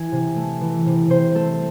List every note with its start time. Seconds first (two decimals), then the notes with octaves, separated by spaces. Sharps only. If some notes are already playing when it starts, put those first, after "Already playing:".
Already playing: E3 G#5
0.12 C3
0.36 A3
0.61 E3
0.86 C3
1.10 C3 C5
1.35 A3 A4